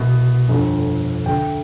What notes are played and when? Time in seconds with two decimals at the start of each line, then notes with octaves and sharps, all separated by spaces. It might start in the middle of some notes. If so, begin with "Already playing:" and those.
Already playing: C2 B2
0.48 G1 F2 D3
1.26 D2 D3 G5